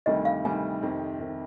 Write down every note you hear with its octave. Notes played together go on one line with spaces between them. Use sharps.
D2 C3 D#3 G3 D#5
F5
D2 C3 D#3 G3 G#5
F2 C3 D#3
C3 D#3